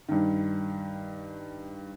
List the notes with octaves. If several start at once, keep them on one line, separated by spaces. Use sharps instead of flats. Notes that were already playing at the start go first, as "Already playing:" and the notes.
G2 D#3